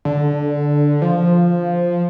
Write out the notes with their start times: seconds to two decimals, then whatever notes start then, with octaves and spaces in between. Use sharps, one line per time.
0.05 D3
1.02 F3